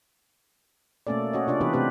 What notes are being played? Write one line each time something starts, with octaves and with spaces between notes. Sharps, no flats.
B2 A3 A#3 C#4 A4 D5
C#4 F#4 C#5 D#5
C3 D4 F4 D5
E3 B3 D4 E4 G4 B4
C3 A3 C4 G4 B4